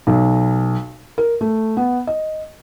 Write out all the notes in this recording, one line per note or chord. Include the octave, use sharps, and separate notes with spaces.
B1
A#4
A3
B3
D#5